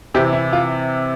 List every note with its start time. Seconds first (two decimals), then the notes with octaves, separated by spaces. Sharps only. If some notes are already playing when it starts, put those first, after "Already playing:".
0.14 C3 E3 G4
0.33 E4
0.53 F4